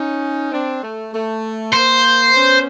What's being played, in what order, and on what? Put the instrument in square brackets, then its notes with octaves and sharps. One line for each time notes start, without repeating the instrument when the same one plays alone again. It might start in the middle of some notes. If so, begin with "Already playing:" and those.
Already playing: [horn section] C#4 D#4
C4 D4
A3
A3
[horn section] A#3 [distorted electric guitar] C5
[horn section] B3 C#4